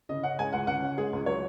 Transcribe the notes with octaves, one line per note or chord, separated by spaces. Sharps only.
C#3 D#5
C#4 F#5
G#3 G#5
C#2 F#5
C#3 F#5
C#4
G#3 G#4
C#2
F#3 C#5